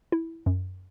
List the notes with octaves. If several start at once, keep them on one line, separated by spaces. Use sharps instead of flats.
E4
F#2